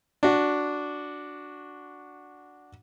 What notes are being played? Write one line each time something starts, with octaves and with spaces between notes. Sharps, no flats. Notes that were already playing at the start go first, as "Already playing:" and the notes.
D4 F#4